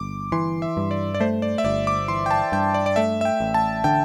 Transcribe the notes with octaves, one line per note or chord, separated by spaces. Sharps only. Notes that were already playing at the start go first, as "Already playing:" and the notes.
Already playing: G1 D6
E3 C6
E5
G2
D5
D5
A3 C5
D5
E5
G1 D5
D6
E3 C6
G5
A5
G2 G5
D5
D5
A3 E5
E5
G5
A1
A5
D3 G5